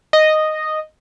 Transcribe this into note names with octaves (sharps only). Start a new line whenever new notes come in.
D#5